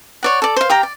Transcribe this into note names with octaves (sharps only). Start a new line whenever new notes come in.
C#5 D5 F#5
A4 D5
C5 F5
G4 F5 G5 A#5
D5